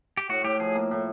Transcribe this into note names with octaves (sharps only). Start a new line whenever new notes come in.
G4
A2 F#4
A2 G4
F3 G#4
A#3
A2